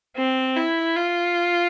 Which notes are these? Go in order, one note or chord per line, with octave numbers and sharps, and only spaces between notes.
C4
E4
F4